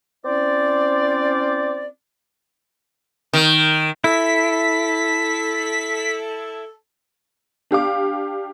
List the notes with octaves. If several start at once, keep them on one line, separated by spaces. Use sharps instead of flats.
C4 C#4 E4 C5 D5
D#3
E4 A4 B6
D4 G4 F5 D6